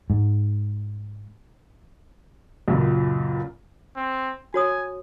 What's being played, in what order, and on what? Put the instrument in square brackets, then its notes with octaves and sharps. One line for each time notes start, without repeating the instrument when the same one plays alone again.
[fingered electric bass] G#2
[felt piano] C#2 F#2 A#2 C#3
[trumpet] C4
[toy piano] F#4 C#5 D#6 [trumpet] G#5